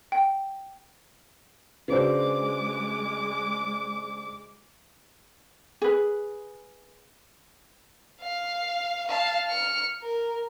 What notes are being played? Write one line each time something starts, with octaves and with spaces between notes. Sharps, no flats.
G5
C#3 G#3 D4 F#4 B4 C5 D6
G#4 B4
F5
F5 A5
F6 C#7
A#4